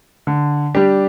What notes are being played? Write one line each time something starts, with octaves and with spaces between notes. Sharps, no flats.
D3
G3 D4 G4